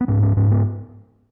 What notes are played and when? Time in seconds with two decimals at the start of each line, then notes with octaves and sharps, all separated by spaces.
0.01 B3
0.08 G#2 C#4
0.23 C#4
0.37 G#2 C#4
0.51 B3